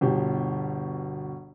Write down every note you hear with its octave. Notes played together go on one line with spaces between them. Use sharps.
G1 B2 G4